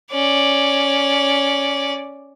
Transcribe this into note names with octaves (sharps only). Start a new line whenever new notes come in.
C#4 D5